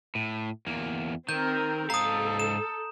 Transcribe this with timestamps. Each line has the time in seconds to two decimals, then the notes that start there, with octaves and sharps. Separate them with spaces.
0.15 A2
0.67 E2 A#3
1.29 D#3 C4 A#4 G6
1.90 G#2 A4 F5 A#5 D#6
2.40 E7